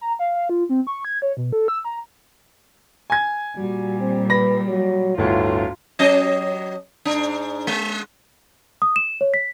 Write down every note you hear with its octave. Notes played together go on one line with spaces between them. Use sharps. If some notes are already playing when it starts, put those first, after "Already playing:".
A#5
F5
F5
F4
C4
C#6
G#6
C#5
B2
A4
E6
A#5
G#5 G#6
A#2 G3 F#4
C4
B4 B5 A#6
F#3
G1 D2 A2 F4
F#3 C#4 D#5
G#2 D4
G#3
D#6
E7
C#5
B6